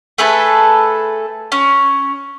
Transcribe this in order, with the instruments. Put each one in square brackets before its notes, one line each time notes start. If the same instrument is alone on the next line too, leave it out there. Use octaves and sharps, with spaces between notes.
[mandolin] A3 G#4 A4 B4
C#4